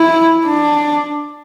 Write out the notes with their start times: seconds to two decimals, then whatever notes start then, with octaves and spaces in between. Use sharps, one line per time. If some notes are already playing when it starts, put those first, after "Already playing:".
Already playing: E4
0.46 D4